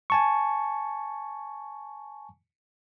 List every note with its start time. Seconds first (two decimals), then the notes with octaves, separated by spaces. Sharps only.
0.10 G#5 A5 C#6